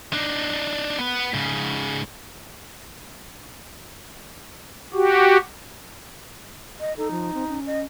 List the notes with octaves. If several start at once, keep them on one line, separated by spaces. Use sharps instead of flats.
D4 D#4
B3 B4
G#2 C#3
F#4 G4
D#5
D#4 A4
F3
C4
C#4
D#5